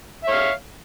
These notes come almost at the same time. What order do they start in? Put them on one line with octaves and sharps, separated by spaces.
E5 C#5 F5